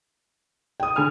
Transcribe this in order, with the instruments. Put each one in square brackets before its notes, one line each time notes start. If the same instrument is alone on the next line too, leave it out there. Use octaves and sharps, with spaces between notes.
[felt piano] G5 D#6
[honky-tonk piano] D3 G#5 F6